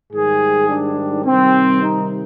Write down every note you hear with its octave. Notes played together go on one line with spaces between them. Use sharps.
G#2 D#3 G3 G#4
D4
C3 D#3 G3 C4
D#4